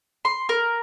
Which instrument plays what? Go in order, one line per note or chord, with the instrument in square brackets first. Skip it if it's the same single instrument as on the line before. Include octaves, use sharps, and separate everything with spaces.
[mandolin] C6
A#4